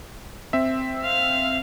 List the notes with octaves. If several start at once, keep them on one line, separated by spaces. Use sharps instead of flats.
C4 E5
F5